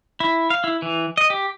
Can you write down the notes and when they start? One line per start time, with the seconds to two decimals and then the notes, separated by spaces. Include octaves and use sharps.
0.20 E4
0.50 F5
0.64 E4
0.82 E3
1.17 D#5
1.30 G4